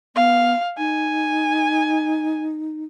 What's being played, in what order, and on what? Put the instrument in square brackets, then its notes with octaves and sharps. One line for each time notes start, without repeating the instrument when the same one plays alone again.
[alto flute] B3 [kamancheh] F5
[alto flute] D#4 [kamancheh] G#5